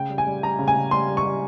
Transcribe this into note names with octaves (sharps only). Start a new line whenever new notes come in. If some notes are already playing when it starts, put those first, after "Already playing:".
Already playing: C#3 G5
G3
G#5
G3
G3 A#5
C#3
G#5
C#3
G3 C6
G3
C#6
G3